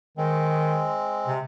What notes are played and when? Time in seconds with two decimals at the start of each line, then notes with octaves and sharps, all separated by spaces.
0.17 D#3 G#3 C4
1.27 C3